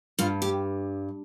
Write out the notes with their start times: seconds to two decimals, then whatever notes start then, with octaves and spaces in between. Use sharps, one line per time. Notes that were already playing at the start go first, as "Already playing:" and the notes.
0.19 G2 F4
0.42 G4